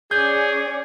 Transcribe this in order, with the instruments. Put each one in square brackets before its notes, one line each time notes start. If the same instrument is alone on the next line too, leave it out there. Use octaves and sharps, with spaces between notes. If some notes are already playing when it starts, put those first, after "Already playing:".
[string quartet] C#4 D5 [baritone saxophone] G#4 [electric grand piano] G6